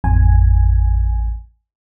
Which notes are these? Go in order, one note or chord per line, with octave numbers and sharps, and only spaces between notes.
A1 F2 G#5